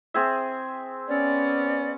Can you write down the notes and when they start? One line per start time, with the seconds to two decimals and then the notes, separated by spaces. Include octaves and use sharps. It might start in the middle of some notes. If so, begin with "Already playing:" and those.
0.14 C4 G#4 E5
1.08 B3 C#4 D5